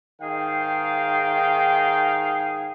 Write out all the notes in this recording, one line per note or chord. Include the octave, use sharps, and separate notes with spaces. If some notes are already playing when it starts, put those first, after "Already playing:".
G#2 D#3 G#4 F5 G5